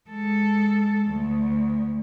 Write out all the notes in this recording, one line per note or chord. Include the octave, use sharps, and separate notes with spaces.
G#3 A4
D2